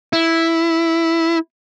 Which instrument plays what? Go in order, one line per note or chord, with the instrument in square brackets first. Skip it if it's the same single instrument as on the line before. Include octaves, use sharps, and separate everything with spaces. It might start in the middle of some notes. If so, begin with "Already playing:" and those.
[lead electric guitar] E4